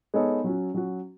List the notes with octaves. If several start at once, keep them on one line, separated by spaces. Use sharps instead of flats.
G#3 B3 D#4 A4 C#5
F#3 C#4 F#4
F#3 C#4 F#4